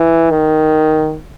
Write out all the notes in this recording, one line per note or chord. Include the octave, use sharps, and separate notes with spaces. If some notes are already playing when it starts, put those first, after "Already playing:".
Already playing: E3
D#3